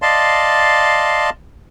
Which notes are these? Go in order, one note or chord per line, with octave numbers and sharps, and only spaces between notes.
D5 D#5 F5 A5 C6